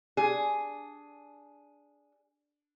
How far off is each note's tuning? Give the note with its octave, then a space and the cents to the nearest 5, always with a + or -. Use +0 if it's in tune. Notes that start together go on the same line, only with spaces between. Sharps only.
D4 -5 G#4 +5